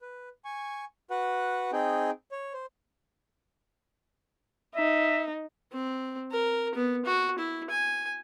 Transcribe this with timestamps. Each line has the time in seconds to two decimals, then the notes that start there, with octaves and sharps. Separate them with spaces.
0.01 B4
0.45 G#5 C#6
1.10 F#4 B4 F#5
1.72 C4 D#4 G#4 G5
2.32 C#5
2.53 C5
4.76 D#4 E5
5.73 C4
6.32 A#4
6.75 B3
7.06 F#4
7.39 E4
7.70 G#5